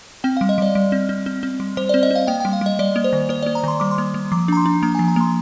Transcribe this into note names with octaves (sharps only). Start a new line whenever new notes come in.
C4 G5
F5
G3
D#5
G3 D5
G3
C4
C4
C4
C4
G3
G3 C5
D5
C4
D#5
C4 F5
A#3 G5
G5
G3
F5
G3 D#5
G3 D5
A#3
C5
D#3
A#3 C5
D5
A#3
A#5
D#3 C6
G3 D6
C6
A#3
A#3
F3 D6
D4 A#5
C6
D4
A#3 A#5
G#5
F3
A#5
A#3 C6